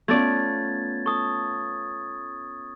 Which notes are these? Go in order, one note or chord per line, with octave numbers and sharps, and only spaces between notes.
A3 B3 C#4 F4 D5 G#6 A6
A4 C#6 D#6